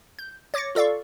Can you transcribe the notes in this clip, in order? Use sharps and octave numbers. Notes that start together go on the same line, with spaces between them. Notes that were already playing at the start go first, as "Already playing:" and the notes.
G6
C#5 D6 A6 A#6 C#7
F4 A4 D5 F5 C#6